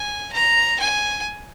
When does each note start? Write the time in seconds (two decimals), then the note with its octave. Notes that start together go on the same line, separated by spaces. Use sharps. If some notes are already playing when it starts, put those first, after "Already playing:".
Already playing: G#5
0.32 A#5
0.80 G#5